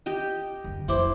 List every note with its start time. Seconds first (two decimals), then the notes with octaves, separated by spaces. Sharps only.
0.06 G4 D#5 G5
0.64 F#1 D3
0.88 F1 F3 E4 C5 D6